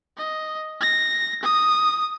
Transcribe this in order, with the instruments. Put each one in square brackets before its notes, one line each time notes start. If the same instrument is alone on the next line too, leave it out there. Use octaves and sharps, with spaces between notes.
[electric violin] D#5
A#6
D#6